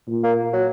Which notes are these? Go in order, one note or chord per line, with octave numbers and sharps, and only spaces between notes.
A#2
A#3
F#3